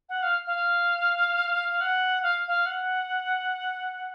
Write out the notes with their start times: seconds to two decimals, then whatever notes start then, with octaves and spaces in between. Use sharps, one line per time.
0.09 F#5
0.22 F5
0.46 F5
1.70 F5
1.80 F#5
2.22 F5
2.47 F5
2.65 F#5